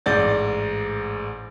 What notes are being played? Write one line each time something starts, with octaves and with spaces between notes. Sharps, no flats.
A1 G#2 D5 G6 A6